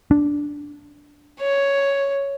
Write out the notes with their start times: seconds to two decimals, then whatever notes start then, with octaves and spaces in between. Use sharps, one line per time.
0.11 D4
1.40 C#5